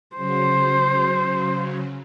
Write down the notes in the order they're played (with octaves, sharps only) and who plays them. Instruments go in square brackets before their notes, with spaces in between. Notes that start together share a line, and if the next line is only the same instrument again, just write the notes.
[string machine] C#3 F#3 [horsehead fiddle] C5